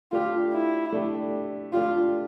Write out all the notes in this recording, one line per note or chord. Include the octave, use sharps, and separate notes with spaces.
A3 D4 F4 G4
E4
A3 D4 G4
A3 D4 F4 G4